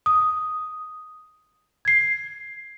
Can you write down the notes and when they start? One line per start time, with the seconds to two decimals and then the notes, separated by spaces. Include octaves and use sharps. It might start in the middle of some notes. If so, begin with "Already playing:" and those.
0.06 D#6
1.85 G#6 C7